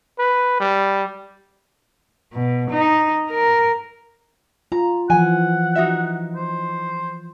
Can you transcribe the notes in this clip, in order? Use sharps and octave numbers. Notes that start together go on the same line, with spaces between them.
B4
G3
B2
D#4
A#4
F4 A#5
E3 F3 F#5 G#5
D#4 F#4 E5
C5